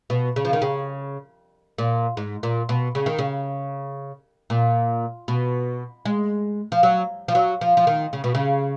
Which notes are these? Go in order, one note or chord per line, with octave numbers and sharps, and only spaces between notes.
B2
C#3
F3
D#3
C#3
A#2
G#2
A#2
B2
C#3
D#3
C#3
A#2
B2
G#3
F3
F#3
F3
F#3
F3
F3
D#3
C#3
B2
C#3